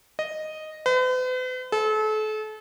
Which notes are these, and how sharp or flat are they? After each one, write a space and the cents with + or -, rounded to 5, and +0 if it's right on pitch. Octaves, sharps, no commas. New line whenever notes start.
D#5 -5
B4 +45
A4 -35